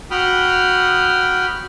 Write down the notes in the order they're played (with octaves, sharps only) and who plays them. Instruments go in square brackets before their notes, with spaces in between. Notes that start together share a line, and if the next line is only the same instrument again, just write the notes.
[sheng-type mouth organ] F#4 G5 B5 D#6 F6